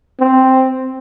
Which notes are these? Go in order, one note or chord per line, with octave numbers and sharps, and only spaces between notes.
C4